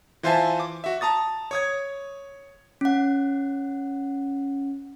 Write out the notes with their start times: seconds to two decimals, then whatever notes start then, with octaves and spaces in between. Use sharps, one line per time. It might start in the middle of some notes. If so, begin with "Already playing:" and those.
0.23 E3 F4 C5 E5 G#5 A5
0.60 D6
0.84 F#4 E5
1.01 A5 A#5 D#6 A6
1.51 C#5 D#6 G#6
2.81 C#4 F#5